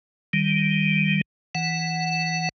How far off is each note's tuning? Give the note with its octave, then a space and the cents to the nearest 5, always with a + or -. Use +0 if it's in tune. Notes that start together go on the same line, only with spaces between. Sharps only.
D#3 +0 G3 +0
E3 +0 F#5 +0